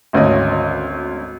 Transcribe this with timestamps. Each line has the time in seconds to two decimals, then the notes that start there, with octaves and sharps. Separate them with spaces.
0.13 G#1 D2 C#4 D#5